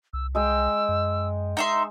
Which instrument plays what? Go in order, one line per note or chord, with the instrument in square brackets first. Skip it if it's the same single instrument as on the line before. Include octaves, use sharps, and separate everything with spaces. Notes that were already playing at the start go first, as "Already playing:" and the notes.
[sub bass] C2 [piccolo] E6
[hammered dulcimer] G#3 D#5 G5 [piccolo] E6
[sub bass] F#2
[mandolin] D#4 E5 C6